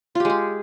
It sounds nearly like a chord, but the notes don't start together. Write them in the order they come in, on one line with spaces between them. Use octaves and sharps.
F4 G4 G#3 G#4